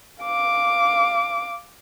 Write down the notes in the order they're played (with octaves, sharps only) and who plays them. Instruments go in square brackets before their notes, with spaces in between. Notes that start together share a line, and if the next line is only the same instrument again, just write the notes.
[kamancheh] F5 D6